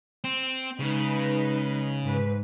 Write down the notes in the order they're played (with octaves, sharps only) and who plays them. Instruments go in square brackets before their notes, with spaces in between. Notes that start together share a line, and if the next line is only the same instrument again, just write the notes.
[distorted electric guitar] C4
[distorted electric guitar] C#3 [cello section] G#3 D#4 B4
[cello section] G#2 B4